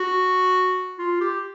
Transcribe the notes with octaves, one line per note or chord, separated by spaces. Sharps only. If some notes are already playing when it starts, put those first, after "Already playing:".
Already playing: F#4
F4
G4